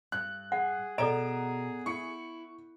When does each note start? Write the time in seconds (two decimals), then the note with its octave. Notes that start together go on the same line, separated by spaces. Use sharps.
0.12 G2 F#6
0.52 G#4 F#5
0.98 B2 G#4 A4 D5 D#5 A#5 D7 E7
1.86 E4 C#6 C#7